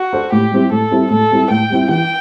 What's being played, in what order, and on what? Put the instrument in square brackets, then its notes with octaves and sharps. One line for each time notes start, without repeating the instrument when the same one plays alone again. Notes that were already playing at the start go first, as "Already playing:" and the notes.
Already playing: [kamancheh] F#4
[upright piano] D4 A4 C5
[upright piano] A2 [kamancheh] G4
[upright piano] G3 C4 E4
[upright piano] A2 [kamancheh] A4
[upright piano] G3 C4 E4
[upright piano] A2 [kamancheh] A4
[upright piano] G3 C4 E4
[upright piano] A2 [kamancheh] G5
[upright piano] G3 C4 E4
[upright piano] E3 [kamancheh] G5